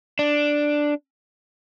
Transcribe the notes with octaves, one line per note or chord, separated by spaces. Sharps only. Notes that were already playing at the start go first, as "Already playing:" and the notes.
D4